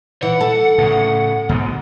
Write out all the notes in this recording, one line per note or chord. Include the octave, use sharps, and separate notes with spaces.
E3 F#5
A4
A2 C#3
G#2 B2 D3